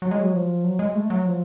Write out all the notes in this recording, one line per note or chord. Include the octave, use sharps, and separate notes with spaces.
F#3
G#3
F#3
F3
F#3
G#3
A3
F#3
F3